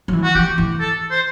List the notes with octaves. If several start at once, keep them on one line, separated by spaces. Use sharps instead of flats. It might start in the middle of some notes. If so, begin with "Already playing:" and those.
F#3
E3
F#4
E3 G4
E3
A4
C5